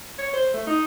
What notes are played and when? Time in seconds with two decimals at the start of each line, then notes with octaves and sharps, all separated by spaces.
0.18 C#5
0.33 C5
0.54 A3
0.67 D#4